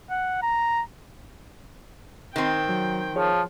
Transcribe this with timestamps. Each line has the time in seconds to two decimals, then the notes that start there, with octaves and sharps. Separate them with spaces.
0.10 F#5
0.43 A#5
2.36 D#3 C4 G5
2.69 F#3
3.16 F3 G#4 C#5